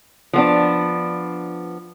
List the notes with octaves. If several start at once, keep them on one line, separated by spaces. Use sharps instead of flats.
F3 B3 D4